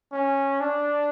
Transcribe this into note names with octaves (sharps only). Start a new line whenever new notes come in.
C#4
D4